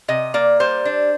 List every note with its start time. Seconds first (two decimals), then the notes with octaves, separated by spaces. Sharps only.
0.08 C3 D#5
0.34 A#3 D5
0.60 G3 C5
0.85 D4